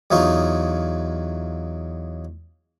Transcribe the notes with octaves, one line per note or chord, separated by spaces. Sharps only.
E2 F#3 D#4 F4 C#6